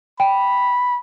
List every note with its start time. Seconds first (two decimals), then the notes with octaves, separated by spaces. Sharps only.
0.20 G5 B5